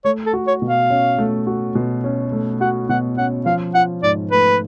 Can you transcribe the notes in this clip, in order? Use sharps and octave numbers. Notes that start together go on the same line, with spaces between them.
A3 C#5
A4
F#4
C#5
B2
F5
C#4
A3
F#4
B2
C#4
A3
F#4 F#5
B2 F#5
C#4 F#5
F3 F5
F4 F#5
G#2 D5
A3 B4